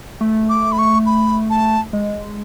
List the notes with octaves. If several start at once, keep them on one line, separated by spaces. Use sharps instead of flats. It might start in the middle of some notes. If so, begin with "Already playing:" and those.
A3
D6
B5
C#6
B5
A5
G#3